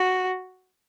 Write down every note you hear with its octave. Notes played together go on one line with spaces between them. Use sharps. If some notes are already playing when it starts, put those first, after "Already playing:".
Already playing: F#4